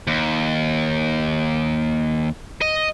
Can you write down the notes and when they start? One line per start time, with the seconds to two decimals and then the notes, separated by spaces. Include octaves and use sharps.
0.07 D#2
2.62 D#5